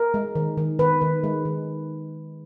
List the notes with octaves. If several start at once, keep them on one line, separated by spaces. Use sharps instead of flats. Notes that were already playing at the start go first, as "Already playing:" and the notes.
Already playing: A#4
G#3
D#3
D#3
D#3 B4
D#3
G#3
D#3